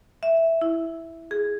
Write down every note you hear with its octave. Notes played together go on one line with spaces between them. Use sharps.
E5
E4
G#4